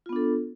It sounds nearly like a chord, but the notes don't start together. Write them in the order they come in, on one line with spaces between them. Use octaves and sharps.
F4 B3 D4 A4